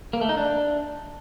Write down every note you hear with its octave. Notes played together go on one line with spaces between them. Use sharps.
A#3
A3
D#4
D4